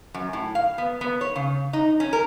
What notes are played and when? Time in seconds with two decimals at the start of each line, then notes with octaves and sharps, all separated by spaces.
0.14 F#2
0.33 A2
0.55 F5
0.78 B3
1.01 B3
1.21 C#5
1.36 C#3
1.73 D#4
2.00 C#4
2.13 A#4